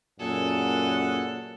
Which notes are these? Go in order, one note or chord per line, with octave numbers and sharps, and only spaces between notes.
F#2 A#2 G#4 A4 F#5